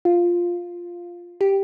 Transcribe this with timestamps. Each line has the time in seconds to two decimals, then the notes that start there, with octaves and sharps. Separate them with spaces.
0.05 F4
1.41 G4